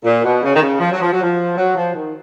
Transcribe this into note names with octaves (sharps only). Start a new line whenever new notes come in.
A#2
B2
C#3
D#3
C#3
F3
F#3
F3
F#3
F3
F#3
F3
D#3